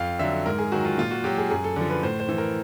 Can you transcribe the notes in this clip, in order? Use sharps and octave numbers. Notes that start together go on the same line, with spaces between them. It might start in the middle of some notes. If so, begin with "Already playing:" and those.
Already playing: F2 F5
D3 F#3 E5
G#2 A#4
G#4
D#3 F#3 F#4
F4
A#2 F4
F#4
F#3 G4
G#4
F#2 G#4
A4
D3 F3
B4
A2 C5
C5
E3
A#4